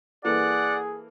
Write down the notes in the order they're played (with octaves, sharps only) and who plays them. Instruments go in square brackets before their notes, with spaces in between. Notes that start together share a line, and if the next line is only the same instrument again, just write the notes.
[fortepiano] E3 A#3 A4 [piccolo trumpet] G#4 [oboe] D5 [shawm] F#5